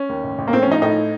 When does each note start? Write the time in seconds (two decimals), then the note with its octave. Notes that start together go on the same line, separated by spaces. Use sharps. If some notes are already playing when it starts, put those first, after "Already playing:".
Already playing: C#4
0.09 D#2
0.23 A1
0.38 A1
0.48 A#3
0.53 A2 C4
0.62 C#4
0.68 F3 D#4
0.82 A2 D#4